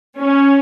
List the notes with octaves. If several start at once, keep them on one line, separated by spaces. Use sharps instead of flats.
C#4